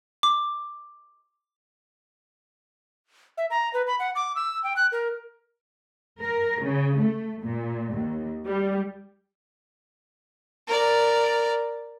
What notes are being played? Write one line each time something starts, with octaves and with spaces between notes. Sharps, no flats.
D6
E5
A#5
B4
B5
F#5
D6
E6
G5
F#6
A#4
A#4
C#3
A3
A#2
D#2
G3
A#4 D5